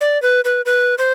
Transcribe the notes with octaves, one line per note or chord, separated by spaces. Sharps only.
D5
B4
B4
B4
C5